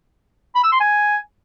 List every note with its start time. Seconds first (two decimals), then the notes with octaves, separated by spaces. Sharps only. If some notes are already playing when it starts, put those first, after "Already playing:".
0.55 B5
0.64 E6
0.72 C6
0.80 G#5